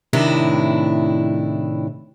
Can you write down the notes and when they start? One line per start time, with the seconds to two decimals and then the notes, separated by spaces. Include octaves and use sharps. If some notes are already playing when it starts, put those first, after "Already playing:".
0.13 A2 C3 D#3 D4 E4